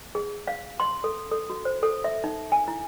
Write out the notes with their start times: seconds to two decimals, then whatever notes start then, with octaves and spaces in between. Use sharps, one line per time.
0.15 G#4
0.47 F5
0.80 C6
1.04 A4
1.31 A4
1.50 F#4
1.65 C5
1.83 A4
2.04 E5
2.24 D#4
2.52 G#5
2.68 E4